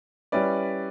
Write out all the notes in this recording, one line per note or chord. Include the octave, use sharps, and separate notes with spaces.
G3 C#4 E4 B4 D5